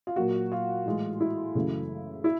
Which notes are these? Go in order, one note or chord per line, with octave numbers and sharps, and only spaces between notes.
F4
A#2 F#3 A#3 F#4
F4
A2 E3 G#3
E4
F#2 C#3 E3 A3
E4